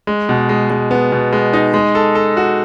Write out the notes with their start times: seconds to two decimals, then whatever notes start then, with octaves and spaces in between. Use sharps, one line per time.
0.07 G#3
0.29 B2
0.49 G#3
0.70 G#3
0.91 B3
1.12 B2
1.33 G#3
1.53 D#4
1.74 G#3
1.95 A4
2.15 A4
2.37 F#4